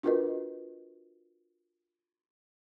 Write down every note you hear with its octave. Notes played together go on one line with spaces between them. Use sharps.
D4 F4 F#4 A#4 B4 D#5